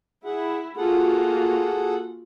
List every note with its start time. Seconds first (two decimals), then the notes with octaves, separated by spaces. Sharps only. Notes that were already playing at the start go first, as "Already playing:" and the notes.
0.25 E4 G#4 F#5
0.77 A#3 F4 F#4 G#4 A4 F#5